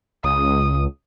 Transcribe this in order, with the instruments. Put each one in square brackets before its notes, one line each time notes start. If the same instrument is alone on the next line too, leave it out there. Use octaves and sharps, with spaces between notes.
[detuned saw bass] C#2 [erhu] D#6